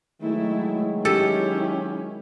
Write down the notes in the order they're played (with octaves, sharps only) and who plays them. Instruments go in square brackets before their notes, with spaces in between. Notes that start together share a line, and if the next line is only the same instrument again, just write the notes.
[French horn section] D#3 F#3 G#3 [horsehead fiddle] A3 E4
[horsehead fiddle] C#4 E4 [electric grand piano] G4 [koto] A4